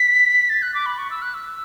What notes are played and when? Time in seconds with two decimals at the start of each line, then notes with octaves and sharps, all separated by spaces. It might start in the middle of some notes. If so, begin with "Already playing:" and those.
Already playing: B6
0.49 A6
0.62 F#6
0.74 D6
0.86 B5
0.98 C#6
1.11 E6
1.22 F#6
1.34 E6